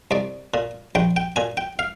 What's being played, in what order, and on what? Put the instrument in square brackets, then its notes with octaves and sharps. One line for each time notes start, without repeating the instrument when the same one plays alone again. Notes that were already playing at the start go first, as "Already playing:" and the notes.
[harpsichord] C2 D5
A#2
A#1 G5
G5
A#2 G#5
G5
F5